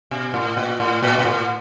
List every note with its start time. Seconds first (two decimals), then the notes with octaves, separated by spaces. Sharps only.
0.11 B2
0.34 A2
0.57 A#2
0.80 A2
1.03 A#2
1.19 A#2
1.25 A2